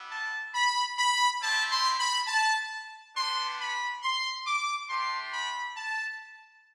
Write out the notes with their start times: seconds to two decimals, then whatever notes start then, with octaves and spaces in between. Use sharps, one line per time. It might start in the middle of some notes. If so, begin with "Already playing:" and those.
Already playing: G3 B3 E4
0.10 A5
0.53 B5
0.97 B5
1.41 C4 E4 G4 A5
1.70 C6
1.99 B5
2.27 A5
3.15 B3 D4 G4 C6
3.59 B5
4.02 C6
4.46 D6
4.89 A3 D4 G4 C6
5.33 B5
5.76 A5